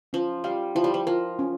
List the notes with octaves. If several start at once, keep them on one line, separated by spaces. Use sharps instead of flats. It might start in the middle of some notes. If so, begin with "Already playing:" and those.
F3 C#4
G3 F5
F3 E4
G3
F3
F3 A#4
C#4